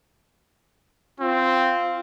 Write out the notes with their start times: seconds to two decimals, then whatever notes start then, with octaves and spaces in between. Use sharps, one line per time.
1.20 C4 F4